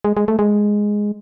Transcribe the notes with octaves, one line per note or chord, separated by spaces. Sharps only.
G#3
G#3
A3
G#3